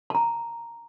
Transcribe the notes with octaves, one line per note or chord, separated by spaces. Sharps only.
A5 A#5